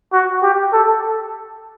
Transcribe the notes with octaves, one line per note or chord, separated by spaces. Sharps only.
F#4
G4
A4